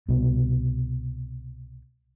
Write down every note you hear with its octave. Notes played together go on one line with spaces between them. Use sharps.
C2 B2